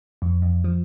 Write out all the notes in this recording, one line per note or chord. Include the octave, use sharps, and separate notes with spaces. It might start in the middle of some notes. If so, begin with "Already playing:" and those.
F2
F2
F3